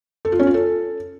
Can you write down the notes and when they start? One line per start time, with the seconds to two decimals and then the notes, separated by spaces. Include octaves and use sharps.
0.25 A4
0.32 F4
0.39 C#4
0.47 F4
0.54 A4